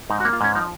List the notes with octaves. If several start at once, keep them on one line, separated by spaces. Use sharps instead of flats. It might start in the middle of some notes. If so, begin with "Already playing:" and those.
G#2 D#4
F#4
A#3
F4
G#2 C#4
F3 D#4